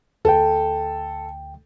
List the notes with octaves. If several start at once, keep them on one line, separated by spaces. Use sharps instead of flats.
D2 A4 G5